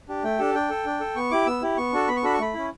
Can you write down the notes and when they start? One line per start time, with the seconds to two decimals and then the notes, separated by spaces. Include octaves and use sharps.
0.08 D4 G4
0.23 A3 G5
0.39 D4 G4 A4
0.54 D4 G5
0.70 A4
0.85 D4
1.00 A4
1.16 B3 C#6
1.31 E4 G4 D6
1.47 B3 E6
1.62 E4 G4
1.77 B3 C#6
1.93 D4 F#4 A4
2.08 B3 B5
2.17 C#6
2.23 D4 F#4 A4 B5
2.34 C#6
2.39 A3 B5
2.54 C#4 E4